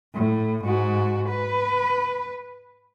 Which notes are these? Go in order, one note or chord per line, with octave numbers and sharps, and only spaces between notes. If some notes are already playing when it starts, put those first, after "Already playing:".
A2
G#2 F#4
B4